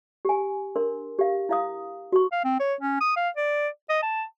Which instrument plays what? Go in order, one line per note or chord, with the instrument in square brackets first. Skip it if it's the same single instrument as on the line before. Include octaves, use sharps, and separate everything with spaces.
[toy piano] G4 G#5
D4 A#4 C6
G4 F5
E4 F5 D#6
F#4 C#6
[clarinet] F5
C4
C#5
C#4
D#6
F5
D5
D#5
A5